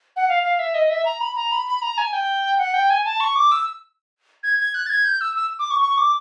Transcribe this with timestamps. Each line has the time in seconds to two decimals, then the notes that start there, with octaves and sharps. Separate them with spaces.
0.16 F#5
0.29 F5
0.43 F5
0.59 E5
0.74 D#5
0.90 E5
1.05 A#5
1.20 B5
1.36 A#5
1.52 B5
1.66 B5
1.82 A#5
1.98 G#5
2.13 G5
2.58 F#5
2.74 G5
2.90 G#5
3.05 A5
3.20 C#6
3.35 D6
3.51 E6
4.43 G#6
4.59 G#6
4.74 F#6
4.86 A6
4.90 G#6
5.05 G6
5.21 E6
5.36 E6
5.59 D6
5.70 C#6
5.81 C#6
5.97 D6